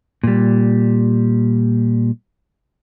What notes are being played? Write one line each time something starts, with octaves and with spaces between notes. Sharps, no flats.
A#2 G3